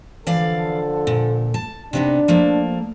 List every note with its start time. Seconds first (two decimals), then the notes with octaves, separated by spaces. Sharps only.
0.27 D3 E3 F3 A4 D5 F5
1.07 A#2
1.54 A5
1.93 C3 B3 D4 D#4
2.28 F3 A3 A#3